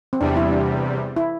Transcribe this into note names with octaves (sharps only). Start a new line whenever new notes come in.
C4
E2 C3 G3 D4
E4
D4
E4